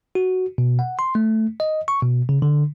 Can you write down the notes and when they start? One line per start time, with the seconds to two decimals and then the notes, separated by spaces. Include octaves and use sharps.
0.15 F#4
0.58 B2
0.79 F#5
0.99 C6
1.15 A3
1.60 D#5
1.88 C#6
2.02 B2
2.29 C#3
2.42 D3